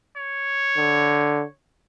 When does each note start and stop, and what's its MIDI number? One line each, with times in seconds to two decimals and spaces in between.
0.16 1.53 73
0.77 1.44 50